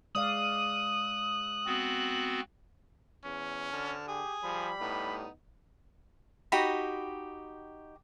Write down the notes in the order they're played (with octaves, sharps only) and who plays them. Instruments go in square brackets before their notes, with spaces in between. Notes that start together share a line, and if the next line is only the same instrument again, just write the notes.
[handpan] G#3 D5 F5 [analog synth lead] D#6 [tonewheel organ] F#6
[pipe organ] B3 C4 F#4
[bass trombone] E2 [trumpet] C#4
[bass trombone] D3 [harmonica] A5 F6
[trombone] G4 [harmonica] G#5 D#6
[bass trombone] F3 [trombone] G3 [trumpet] B5
[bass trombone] A2 [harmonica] B3 D#4
[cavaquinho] D#4 F#4 G4 B5